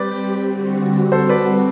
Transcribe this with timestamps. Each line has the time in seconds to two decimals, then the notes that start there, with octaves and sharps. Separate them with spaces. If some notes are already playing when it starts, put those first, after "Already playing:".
Already playing: G3 C4 G4 B4 D5
0.43 D3 G3 C4 F#4
1.12 G3 C4 F#4 A4 C5
1.29 B4 D5